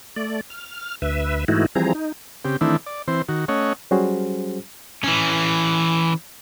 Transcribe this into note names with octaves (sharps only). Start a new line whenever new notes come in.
A3 D5
F6
D2 B4 E5
G#2 E3 A3 D#4 E4 F#4
E3 F3 G3 C4 G#4 A#5
D#4
C#3 C4 G4
D#3 E3 A3 C4 D4 E4
D5
E3 C4 C5
D#3 F#4
A3 C#4 C#5 D#5 F#5
F#3 G3 C#4 F#4 G#4 C5
E3 C#4